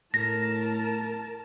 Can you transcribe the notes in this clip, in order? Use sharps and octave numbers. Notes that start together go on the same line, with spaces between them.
A2 A#4 A5 A#6